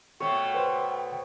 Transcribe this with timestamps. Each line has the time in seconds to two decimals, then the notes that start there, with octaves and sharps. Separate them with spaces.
0.20 B2 A3 C#5 G5
0.54 B4 C5